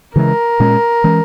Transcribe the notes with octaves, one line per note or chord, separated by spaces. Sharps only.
C#3 E3 G#3 A#4
A#2 G#3 C#4
E3 G#3 C#4